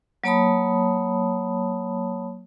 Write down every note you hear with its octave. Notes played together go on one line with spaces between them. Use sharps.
F#3 A#3 C#5 A5 B5 D#6